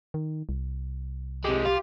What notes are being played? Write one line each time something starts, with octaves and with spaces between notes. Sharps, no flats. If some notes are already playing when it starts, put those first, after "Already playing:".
D#3
C2
C3 G#3 G4
F4